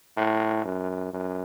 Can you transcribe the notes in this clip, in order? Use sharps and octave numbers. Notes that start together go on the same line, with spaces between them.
A2
F#2
F#2